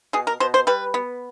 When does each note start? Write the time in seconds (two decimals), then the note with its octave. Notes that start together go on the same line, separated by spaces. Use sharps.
0.13 B2 G#4
0.27 A#4
0.40 B2 C5
0.54 C5
0.67 G3 B4
0.94 B3